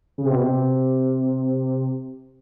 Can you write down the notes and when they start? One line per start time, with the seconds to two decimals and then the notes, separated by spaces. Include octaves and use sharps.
0.18 C#3
0.25 C3
0.32 B2
0.40 C3